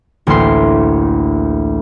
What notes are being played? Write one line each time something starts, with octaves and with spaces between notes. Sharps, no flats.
A1 D2 A#3 E5 C6